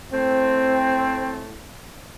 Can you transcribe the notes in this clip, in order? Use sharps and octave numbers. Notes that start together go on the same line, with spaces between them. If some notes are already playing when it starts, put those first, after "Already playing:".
A2 A3 C4